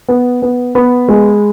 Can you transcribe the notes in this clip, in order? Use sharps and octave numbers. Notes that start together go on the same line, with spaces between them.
B3
B3
B3 B5
G#3